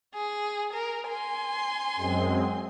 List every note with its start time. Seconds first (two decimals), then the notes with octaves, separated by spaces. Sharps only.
0.15 G#4
0.73 A#4
1.09 G#5 C6
1.96 F#2 G#3 C4